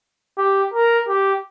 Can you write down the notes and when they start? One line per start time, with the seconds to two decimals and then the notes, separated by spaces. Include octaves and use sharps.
0.38 G4
0.74 A#4
1.08 G4